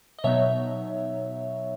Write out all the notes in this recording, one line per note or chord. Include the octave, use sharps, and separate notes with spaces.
D#5
B2 F#3 B3 D#4 C#5 E5